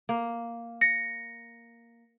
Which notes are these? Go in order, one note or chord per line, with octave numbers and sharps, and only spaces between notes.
A#3
A#6 C#7